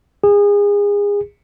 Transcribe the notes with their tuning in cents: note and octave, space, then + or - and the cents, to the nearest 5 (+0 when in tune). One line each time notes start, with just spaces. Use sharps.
G#4 -30